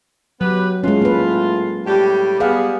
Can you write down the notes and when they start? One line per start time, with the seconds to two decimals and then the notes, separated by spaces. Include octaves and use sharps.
0.41 F#3 B3 G4 B4
0.84 A2 G#3 C#4 F4
1.02 A#3 B4
1.86 A2 G3 G4
2.40 G3 B3 G#4 F5